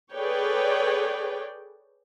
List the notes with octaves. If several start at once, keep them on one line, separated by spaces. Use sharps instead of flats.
G#4 A4 B4 C#5 D5 G5